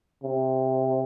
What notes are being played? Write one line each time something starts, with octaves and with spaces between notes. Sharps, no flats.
C3